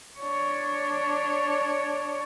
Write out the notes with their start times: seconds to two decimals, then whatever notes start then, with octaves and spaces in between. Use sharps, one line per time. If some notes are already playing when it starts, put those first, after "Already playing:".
0.19 D4 C#5